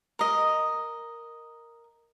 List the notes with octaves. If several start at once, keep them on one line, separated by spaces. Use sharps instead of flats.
A#4 D#5